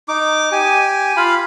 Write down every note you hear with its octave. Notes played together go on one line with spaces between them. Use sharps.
D#4 D6
G4 G#5
F4 F5 B5